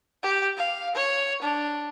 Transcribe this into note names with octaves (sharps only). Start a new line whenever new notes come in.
G4
F5
C#5
D4